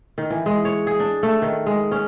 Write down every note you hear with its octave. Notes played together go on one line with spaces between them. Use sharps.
D#3
E3
G#3
C#5
G#4
D4
A3
D#3
G#3
C#4